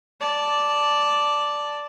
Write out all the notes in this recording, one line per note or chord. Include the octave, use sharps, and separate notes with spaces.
D5 A5